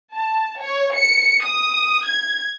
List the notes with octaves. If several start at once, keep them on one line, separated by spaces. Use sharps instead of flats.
A5
C#5
C#7
D#6
G#6